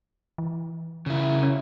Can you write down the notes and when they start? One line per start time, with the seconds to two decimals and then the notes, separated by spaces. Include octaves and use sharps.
0.38 E3
1.06 C#3 E4
1.43 C#4